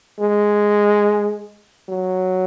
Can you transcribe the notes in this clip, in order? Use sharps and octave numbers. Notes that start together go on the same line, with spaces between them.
G#3
F#3